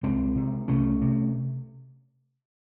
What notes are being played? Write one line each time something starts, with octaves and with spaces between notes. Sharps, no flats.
C2 G#3 C4
C3
C2 A3 C#4
C3